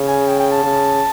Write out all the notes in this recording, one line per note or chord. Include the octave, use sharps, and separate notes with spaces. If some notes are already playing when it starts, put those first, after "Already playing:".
Already playing: C#3
G#5
G5
G5
A5
C#3